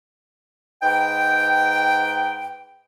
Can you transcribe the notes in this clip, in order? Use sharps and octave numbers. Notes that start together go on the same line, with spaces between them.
G#2 D#4 B4 G5